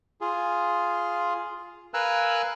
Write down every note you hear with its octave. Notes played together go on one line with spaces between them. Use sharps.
F4 G#4
A#4 B4 F5 G#5 E6 F#6